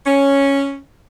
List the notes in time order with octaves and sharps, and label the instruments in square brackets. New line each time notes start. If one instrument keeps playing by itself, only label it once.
[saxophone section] C#4